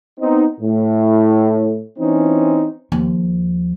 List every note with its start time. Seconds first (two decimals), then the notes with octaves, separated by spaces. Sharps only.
0.20 B3 C4 D#4
0.60 A2
1.98 E3 C4 C#4 D#4
2.92 D#2 F3